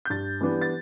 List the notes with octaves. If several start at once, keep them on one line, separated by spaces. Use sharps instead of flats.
G6
G2 A6
E3 G3 B3 D4
A6